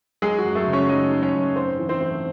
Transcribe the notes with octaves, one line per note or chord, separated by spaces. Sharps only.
F#3 G#3 G#4
F#4
F#2
A3 A4
C#3
C#4 C#5
F#3 D#4 D#5
F#3
C#4 C#5
F#2
G#2 C4 C5
E3
C4 C5
A3